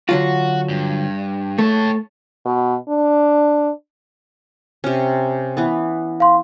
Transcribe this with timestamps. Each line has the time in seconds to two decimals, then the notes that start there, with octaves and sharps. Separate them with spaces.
0.09 D3 F#3 F4 F#4
0.69 G2
1.59 A3 C#5 A5
2.45 B2
2.89 D4
4.84 C3 C#4
5.57 E3 B3
6.20 F5 C6